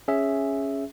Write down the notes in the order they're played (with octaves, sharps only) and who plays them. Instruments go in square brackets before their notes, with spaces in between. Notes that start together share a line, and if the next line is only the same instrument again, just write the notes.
[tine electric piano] C#4 G#4 E5